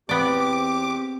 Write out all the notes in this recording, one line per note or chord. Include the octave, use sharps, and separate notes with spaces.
E2 B3 C4 G4 D5 D6